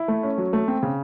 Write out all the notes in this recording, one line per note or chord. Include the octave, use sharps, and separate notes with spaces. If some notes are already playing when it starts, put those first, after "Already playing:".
Already playing: E4
A3
C#4
F#3
A3
C4
C#3